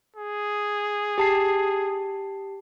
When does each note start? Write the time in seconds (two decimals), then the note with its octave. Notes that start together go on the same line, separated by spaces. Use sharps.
0.16 G#4
1.18 G4 A5 C7